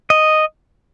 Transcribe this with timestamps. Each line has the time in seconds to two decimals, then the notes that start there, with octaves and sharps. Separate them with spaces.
0.10 D#5